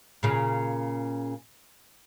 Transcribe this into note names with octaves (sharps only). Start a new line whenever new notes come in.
A#2 C#3